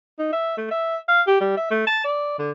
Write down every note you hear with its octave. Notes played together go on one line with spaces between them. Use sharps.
D#4
E5
A3
E5
F5
G4
G3
E5
A3
A5
D5
D3